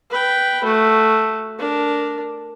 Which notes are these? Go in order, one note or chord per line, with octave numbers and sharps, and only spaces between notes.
B4 G5
A3 F#4
D4 A#4